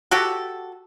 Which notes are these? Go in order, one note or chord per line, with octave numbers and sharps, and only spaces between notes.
F#4 G4 A4